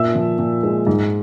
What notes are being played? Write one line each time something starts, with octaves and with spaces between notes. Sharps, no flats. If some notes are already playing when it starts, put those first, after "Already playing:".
Already playing: A#2 E5 E6
F3
A#2
G#3
G#2